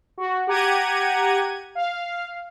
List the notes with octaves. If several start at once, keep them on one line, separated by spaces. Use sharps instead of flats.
F#4
G4 F#5 A#5 G#6 D#7
F5